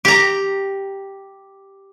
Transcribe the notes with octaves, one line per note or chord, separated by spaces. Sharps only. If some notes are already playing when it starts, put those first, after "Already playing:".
G4 A#5